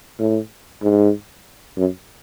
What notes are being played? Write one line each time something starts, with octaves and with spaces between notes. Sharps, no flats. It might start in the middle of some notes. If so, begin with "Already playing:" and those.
A2
G#2
F#2